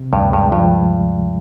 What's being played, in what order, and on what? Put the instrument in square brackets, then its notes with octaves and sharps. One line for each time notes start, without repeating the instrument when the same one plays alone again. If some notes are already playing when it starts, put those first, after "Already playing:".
Already playing: [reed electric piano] C3
[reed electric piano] D2 [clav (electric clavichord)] G2
[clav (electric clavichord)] G2 [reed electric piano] G#3
[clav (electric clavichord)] G2 [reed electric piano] F3